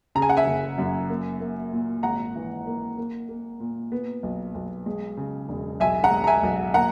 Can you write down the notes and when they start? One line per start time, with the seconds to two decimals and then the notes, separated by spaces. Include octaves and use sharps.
0.15 C#3 A#5
0.22 G#5
0.29 F#5
0.37 E5 G#5
0.46 F#1
0.78 F#2
1.10 A#3
1.40 A#3
1.73 A#2
2.03 G#1 F#5 A#5
2.36 E3
2.67 A#3
2.97 A#3
3.29 A#3
3.60 A#2
3.92 B3
4.23 B1
4.55 B1
4.86 G#3
5.17 C#3
5.49 E1
5.80 B1 E5 G#5
6.04 F#5 A#5
6.11 G#3
6.24 A#5
6.27 E5 G#5
6.43 B1
6.74 A#3 F#5 A#5